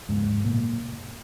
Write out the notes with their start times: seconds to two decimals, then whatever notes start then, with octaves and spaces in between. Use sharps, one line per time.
0.08 D#2 G#2 C#3 G#3
0.44 F#2 A#2 C#3 A#3